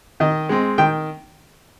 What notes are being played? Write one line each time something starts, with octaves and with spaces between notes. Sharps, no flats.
D#3 D#5
G#3 C4
D#3 G5